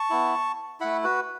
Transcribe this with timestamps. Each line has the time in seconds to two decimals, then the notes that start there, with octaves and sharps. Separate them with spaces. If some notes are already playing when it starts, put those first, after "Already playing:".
Already playing: A5 C#6
0.10 B3 E4
0.80 A3 E4 F#5 B5
1.04 F#4 B4